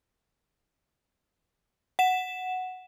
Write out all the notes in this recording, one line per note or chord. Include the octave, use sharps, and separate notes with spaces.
F#5 E7